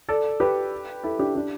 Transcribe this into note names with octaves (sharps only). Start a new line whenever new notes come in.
A4 D5
G4 B4
E4 A4
D4 G4
D4 G4